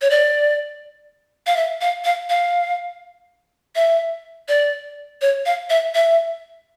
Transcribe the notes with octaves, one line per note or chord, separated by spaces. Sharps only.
C#5
D5
F5
E5
F5
F5
F5
E5
D5
C#5
F5
E5
E5